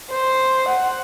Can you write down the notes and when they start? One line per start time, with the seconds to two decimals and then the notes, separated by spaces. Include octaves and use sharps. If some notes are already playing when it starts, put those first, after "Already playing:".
0.11 C5
0.68 F#5